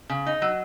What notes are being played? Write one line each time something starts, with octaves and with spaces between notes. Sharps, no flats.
C#3
D#4
F#3